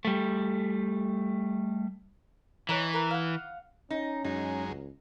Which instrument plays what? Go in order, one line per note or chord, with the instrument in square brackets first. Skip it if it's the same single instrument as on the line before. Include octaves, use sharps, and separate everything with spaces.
[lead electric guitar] G3 A3
[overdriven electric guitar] E3 [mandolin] D#4 C#5 F#5
[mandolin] A#4 B4
F5 F#5
[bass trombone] C#4 [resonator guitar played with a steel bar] D#4
[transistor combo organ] F#2 G#3 [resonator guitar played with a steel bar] D#4
[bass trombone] C#2